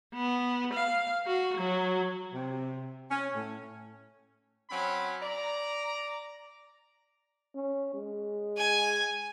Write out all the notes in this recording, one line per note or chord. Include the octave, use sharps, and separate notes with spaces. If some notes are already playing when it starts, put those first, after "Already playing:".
B3
F5
F#4
F#3
C3
C#4
A2
F#3 C4 C#4 B5
D5 A#5
C#4
G#3
G#5